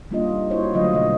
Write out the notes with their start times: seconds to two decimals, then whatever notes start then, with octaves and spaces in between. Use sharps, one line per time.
0.11 G3 A#3 D4 D#4 F4 D#5
0.50 E4 F#4 C5 C#5
0.73 D3 F#3 A3 F4 D#5
0.94 B2 D#5